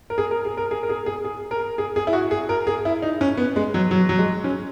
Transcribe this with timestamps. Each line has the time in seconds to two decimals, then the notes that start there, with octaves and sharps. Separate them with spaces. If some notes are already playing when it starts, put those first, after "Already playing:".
0.10 A#4
0.18 G#4
0.31 A#4
0.45 G#4
0.57 A#4
0.71 G#4
0.83 A#4
0.90 G#4
1.06 G#4
1.25 G#4
1.51 A#4
1.78 G#4
1.96 G#4
2.07 E4
2.13 F#4
2.31 G#4
2.49 A#4
2.67 G#4
2.85 E4
3.02 D#4
3.21 C#4
3.37 B3
3.56 G#3
3.74 F#3
3.91 F#3
4.09 F#3
4.19 G#3
4.44 C#4